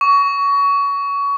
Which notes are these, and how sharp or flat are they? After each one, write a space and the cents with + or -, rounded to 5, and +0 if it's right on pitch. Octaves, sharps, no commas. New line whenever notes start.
C#6 +25